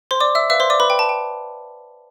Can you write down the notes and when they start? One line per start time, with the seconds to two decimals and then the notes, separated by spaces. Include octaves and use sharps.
0.11 C5 C6
0.20 D5 D6
0.35 E5 E6
0.50 B4 E5 F5 E6
0.60 C5 C6
0.70 D5 D6
0.80 B4 B5
0.90 G5
0.99 A5
1.09 G5